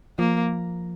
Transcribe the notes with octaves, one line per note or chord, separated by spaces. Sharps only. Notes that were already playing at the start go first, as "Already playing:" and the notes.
F3 A#3